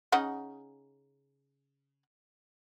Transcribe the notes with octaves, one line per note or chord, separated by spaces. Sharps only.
C#3 D#4 F#5